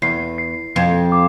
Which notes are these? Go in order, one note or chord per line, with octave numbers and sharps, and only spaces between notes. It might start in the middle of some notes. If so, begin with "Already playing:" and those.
E2 C7
C7
F2 C7
D6